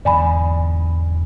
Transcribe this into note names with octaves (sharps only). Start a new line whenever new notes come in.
E2 G#2 D3 D5 G#5 B5